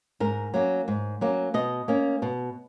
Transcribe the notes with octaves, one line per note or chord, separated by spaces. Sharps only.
G#2 A#4
F#3 A#3 C#4
G#2
F#3 A#3 C#4
B2 D#5
A#3 C#4
B2